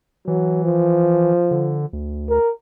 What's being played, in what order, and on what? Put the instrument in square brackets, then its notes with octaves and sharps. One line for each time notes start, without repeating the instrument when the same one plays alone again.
[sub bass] E3 [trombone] F#3
[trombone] F3
[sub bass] D3
D2
[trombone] A#4